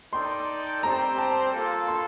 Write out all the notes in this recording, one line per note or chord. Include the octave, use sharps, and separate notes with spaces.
D#4 A4 D5 G5 C6
G3 C4 G4 C5 A#5
A5
A#3 F4 A4
C6